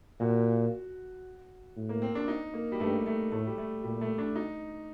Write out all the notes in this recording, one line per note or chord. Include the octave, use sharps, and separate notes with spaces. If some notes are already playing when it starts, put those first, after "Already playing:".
A#2 F#4
A2
A#3
C4
D4
D#4
A#3
G3
G2 A3
A3
A2 A3
G3
A3
A#2 G3
A3
D4
D#4